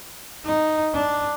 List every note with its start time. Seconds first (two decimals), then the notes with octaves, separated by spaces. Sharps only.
0.45 D#4
0.93 D4